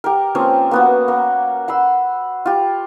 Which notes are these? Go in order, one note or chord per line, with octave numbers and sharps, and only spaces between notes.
G4 A#4
F3 A#3 C4 C#4
A#3 B3 F#4
A#3
F#5 B5 C6 E6
F4 G4